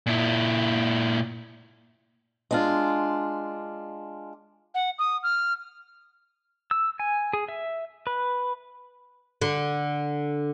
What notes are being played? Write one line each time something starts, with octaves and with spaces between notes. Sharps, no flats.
A#2 E4
G#3 D4 F4
F#5
D#6
F6
E6
G#5
G#4
E5
B4
D3